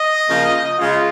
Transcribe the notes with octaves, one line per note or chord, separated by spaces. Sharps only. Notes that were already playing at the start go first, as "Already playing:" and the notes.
Already playing: D#5
C#3 F3 A#3
C#3 G#3 F4